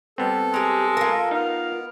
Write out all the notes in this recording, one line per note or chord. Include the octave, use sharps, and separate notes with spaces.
G3 B3 C4 A4
G#3 G4 A#5
F4 A#4
B3 D#4 F5